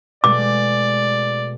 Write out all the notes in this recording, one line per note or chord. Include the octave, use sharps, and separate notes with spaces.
B2 G#3 A3 D5 D6